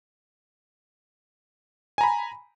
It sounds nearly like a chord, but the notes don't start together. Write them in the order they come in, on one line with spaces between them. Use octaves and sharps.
G#5 A#5 B5